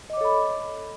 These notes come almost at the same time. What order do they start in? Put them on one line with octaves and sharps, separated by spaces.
D#5 D6 C#5 A4 B5